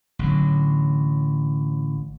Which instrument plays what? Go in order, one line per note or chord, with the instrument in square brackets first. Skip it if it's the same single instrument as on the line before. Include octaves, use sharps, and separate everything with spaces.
[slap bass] A1 D3 F#3